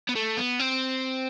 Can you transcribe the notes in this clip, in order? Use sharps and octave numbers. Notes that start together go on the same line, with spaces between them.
B3
A3
B3
C4